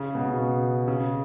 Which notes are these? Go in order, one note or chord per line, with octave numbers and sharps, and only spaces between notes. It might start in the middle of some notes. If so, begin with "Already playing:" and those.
Already playing: C#3
B2
C#3
B2
C#3